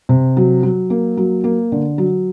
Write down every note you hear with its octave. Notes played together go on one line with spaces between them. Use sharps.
C3
F#3
F#3
A#3
F#3
A#3
D3
F#3